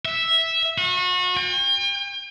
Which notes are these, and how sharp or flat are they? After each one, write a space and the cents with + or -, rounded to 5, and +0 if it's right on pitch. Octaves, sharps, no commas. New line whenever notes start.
E5 -5
F#4 -35
G5 +40